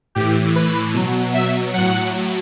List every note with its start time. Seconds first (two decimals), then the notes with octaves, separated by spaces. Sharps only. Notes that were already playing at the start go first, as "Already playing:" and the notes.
0.15 A2 E3 G4
0.56 B4
0.94 B2 F#3
1.34 E5
1.74 A2 F#3 F#5